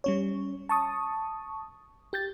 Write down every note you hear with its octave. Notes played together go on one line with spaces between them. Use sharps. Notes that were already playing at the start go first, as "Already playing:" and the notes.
G3 C#4 C#5
A5 C#6 D#6
G4 G6 A6